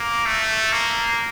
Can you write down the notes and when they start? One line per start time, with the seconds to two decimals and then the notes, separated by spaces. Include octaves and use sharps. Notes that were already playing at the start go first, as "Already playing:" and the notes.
Already playing: A#3
0.26 A3
0.72 A#3